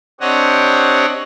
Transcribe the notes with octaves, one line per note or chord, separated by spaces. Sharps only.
C4 D4 G4 C#5 D#5 F#5